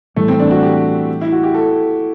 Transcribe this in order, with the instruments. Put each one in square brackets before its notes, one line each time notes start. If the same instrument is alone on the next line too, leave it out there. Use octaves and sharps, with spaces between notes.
[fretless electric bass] A2 E3 G3 [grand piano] A3
[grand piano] C4
D4
F#4
G4
E4
F#4
G4
A4